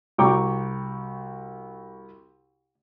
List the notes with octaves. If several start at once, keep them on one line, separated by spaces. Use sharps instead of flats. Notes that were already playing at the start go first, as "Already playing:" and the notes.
C2 F#4 G5 A#5 C#6 D6